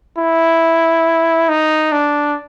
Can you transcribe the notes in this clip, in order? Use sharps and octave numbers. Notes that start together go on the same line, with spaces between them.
E4
D#4
D4